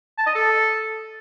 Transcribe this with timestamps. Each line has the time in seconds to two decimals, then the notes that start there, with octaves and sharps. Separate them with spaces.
0.18 A5
0.27 D#5
0.35 A4